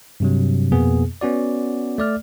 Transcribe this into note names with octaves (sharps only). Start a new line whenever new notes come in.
G2 C3 F#3
F2 B2 A#3 B3 G#4
B3 C#4 F#4 D5
A3 D5 F6